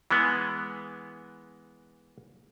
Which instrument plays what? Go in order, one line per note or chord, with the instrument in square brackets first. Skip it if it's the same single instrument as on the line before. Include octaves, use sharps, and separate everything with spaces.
[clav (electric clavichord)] E3 G#3 B3